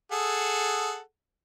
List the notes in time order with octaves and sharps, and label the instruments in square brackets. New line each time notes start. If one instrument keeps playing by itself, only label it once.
[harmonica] G#4 A4 F#5